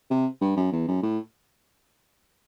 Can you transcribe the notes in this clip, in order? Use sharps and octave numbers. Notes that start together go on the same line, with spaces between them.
C3
G2
F#2
E2
F#2
A2